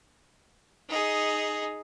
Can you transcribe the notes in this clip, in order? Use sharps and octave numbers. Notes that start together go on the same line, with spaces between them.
D#4 G#4